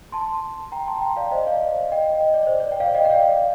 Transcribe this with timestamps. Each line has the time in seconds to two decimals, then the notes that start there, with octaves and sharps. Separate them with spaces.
0.12 A5 C6
0.72 G5 A#5
0.87 A5 C6
1.02 G5 A#5
1.16 D5 F5
1.31 C5 D#5
1.47 D5 F5
1.91 D#5 G5
2.21 D#5
2.34 D5
2.47 C5
2.60 D5
2.72 G5
2.80 D5 F5
2.95 D#5 G5
3.05 G5
3.10 D5 F5